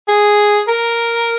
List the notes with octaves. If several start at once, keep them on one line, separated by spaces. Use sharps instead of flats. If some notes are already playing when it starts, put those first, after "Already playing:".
G#4
A#4